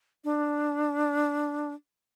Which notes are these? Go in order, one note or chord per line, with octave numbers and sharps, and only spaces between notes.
D4